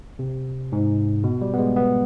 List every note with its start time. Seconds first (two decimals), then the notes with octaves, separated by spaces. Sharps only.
0.19 C3
0.72 G#2
1.24 B2
1.41 G3
1.54 B3
1.58 G#3
1.76 B3